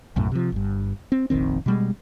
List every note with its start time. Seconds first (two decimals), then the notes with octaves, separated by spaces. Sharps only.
0.16 B1 F#2 A2
0.32 C3 F3
0.52 G1 G2
1.12 C4
1.30 F1 A#1 D#3 C4
1.66 B2 G3 G#3